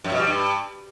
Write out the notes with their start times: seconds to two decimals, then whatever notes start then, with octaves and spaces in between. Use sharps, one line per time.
0.04 F#2
0.12 B2
0.19 G3
0.27 G2